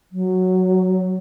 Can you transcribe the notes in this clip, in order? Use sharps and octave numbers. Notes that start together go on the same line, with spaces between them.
F#3